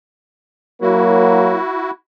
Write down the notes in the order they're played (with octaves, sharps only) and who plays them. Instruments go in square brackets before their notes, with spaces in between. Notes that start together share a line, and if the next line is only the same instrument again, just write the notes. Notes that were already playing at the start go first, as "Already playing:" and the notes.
[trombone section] F#3 A#3 [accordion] E4 F#4